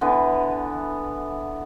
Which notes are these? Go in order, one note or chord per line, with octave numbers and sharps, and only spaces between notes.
D3 E3 B3